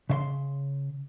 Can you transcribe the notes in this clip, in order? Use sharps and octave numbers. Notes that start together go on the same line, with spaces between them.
C#3 E5 C6